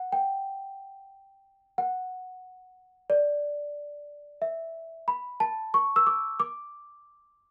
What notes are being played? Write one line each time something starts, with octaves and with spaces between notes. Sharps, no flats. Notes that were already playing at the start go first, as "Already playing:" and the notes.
Already playing: F#5
G5
F#5
D5
E5
B5
A5
C#6
E6
D6
D6